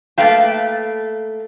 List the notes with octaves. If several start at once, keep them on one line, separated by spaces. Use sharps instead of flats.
A3 A#3 B4 F5 G5